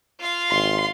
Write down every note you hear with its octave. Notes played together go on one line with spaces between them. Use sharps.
F4 F5
G#1 C6